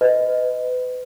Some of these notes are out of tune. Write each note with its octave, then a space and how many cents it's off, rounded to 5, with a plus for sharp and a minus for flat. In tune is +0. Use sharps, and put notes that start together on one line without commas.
B4 +30 D#5 +0